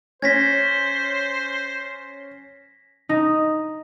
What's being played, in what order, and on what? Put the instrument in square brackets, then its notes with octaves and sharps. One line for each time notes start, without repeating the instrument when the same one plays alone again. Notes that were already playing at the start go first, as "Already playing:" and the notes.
[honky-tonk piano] C#4 [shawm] C5 [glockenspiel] G#6 A#6 B6
[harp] D#4